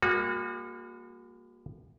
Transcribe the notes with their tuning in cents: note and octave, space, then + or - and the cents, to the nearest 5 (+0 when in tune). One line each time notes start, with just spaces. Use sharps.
G3 +45 A#3 +0 F#4 -30